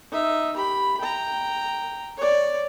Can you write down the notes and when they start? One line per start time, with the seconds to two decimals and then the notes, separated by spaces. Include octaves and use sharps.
0.12 D#4 E5
0.56 G4 B5
1.01 G5 A#5
2.18 C#5 D5